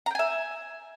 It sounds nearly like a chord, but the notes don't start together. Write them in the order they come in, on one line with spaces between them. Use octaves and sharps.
A#5 G5 G#5 E5